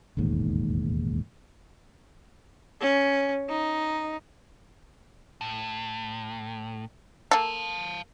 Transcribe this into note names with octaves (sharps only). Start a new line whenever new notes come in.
E1 A1 D#2 G#2
C#4
D#4
A2
A#3 A4 F5 A5